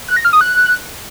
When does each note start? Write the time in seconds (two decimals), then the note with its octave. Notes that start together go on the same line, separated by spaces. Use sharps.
0.08 F#6
0.17 A#6
0.25 F6
0.33 D#6
0.41 F#6